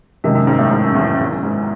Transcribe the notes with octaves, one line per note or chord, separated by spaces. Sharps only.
F#2 C3 D#3 G#3 D#4
F#2
G#2
A2
G#2
F#2
E2
F#2
E2
F#2
G#2